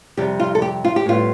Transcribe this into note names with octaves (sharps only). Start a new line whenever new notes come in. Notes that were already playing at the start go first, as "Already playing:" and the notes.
F2 C3 G3 G4
F4
A4
G4
F4
G4
A2 G3 B3 F4